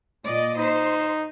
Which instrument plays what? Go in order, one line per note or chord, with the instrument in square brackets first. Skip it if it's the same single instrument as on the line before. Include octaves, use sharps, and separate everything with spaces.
[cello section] A#2 D5 D#5
[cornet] D#4 [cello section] C5